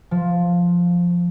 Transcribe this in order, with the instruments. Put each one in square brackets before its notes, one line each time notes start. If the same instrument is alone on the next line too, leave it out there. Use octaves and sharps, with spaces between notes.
[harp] F3